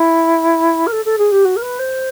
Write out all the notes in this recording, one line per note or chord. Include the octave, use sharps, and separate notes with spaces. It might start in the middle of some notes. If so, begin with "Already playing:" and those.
Already playing: E4
A#4
A4
A4
G#4
G4
F#4
A#4
B4
C5